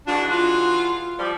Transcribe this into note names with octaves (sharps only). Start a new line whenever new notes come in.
E3 G#3 D4 F#4
F4
F3 G3